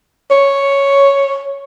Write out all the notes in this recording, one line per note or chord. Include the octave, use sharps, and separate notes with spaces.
C#5